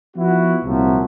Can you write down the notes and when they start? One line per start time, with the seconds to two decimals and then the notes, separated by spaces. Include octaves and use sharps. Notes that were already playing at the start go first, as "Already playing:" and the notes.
0.17 F3 B3 E4 F#4
0.63 C2 A#2 F3 F#3 E5